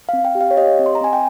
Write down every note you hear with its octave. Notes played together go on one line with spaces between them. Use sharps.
C4 F5
G5
G4
F5
C#5
G4 D#5
C4
C6
A#5
C4 G#5
G5